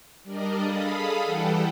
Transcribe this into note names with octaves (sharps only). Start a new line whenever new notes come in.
G3 D4 A#4 D5 D#5
G#4 A4 F5 B5 D#6
E3 G3 A4 F#5 G5